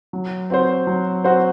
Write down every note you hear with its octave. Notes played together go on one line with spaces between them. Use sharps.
F#3
C4 F#4 C5
F#3
C4 F#4 C5